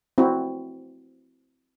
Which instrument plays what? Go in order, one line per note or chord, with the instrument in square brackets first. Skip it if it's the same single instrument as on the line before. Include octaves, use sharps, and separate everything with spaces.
[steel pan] C4 E4 F#4